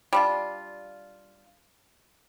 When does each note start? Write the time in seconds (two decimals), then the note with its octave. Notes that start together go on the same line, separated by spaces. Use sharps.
0.13 G3 D4 F4